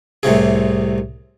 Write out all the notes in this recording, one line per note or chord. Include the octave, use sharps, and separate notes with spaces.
C2 A2 C3 G#4